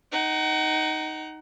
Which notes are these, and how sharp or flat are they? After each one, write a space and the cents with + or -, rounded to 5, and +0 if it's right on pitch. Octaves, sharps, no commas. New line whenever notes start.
D#4 +0 F#5 +35